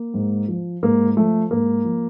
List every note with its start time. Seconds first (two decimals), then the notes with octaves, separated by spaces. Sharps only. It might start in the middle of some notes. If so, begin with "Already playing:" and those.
Already playing: A#3
0.14 G#2
0.48 F3
0.83 G#2 A#3
1.17 F3 A3
1.51 G#2 A#3
1.85 F3